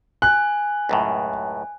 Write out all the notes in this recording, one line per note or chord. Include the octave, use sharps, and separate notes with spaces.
G#5 F#6
C#2 F#2 A2